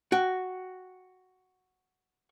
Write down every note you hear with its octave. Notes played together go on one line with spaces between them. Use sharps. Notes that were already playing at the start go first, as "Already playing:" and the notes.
F#4 G5